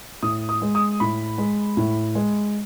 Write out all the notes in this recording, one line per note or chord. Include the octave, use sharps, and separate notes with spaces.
A2 D#6
D#6
G#3
D#6
A2 B5
G#3
A2
G#3